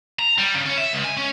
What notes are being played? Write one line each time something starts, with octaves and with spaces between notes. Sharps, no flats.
A#5
G3
C#3
C#4
E5
C#2
G#5
C#4